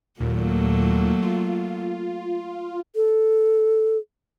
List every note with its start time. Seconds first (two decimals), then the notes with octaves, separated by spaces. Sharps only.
0.20 D#2 A#2 F#3 A3 A#3
1.22 F4
2.96 A4